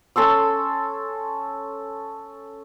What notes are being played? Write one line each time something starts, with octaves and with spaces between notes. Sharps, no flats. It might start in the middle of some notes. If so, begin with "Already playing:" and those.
C#4 A4 C6 E6